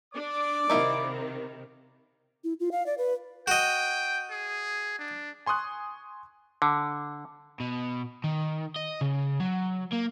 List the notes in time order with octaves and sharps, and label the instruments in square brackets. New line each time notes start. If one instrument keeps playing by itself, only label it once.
[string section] D4 [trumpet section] D5 D6
[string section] C3 D#3 [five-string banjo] D#4 E4 F5
[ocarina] E4
F4
F5
D5
B4
[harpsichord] F#4 D#5 [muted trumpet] G5
[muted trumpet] G#4
D4
[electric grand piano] G#5 C6 C#6 D#6 F#6
[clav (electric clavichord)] D3
[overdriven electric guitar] B2
D#3
D#5
C#3
F#3
A#3